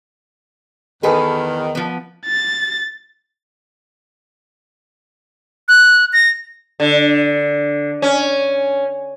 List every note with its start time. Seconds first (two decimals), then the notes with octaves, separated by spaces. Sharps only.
1.03 E2 D#3 G#4 A4 B4
1.75 F3 B3
2.26 A6
5.68 F#6
6.13 A#6
6.80 D3
8.02 C#4